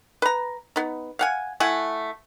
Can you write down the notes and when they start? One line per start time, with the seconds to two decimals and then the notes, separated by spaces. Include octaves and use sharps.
0.22 B4 A#5
0.76 B3 D#4
1.19 F5 F#5 G#5
1.60 A3 E4 F#5 G#5